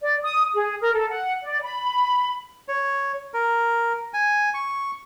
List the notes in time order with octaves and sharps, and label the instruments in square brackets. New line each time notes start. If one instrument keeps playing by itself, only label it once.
[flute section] D5
D#6
G#4
A#4
A4
F#5
D5
B5
[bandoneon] C#5
A#4
G#5
C#6